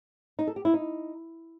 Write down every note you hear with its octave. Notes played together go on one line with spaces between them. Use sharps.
D#4
A4
G4
E4
D#4